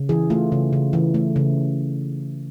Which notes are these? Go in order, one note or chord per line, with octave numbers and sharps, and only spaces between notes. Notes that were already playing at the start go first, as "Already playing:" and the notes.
Already playing: C#3
E3 G#4
A3 F4
C#3
C#3
E3
A3
C#3